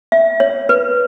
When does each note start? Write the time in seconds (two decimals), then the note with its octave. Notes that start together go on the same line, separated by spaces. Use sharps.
0.12 E5
0.40 C#5
0.69 B4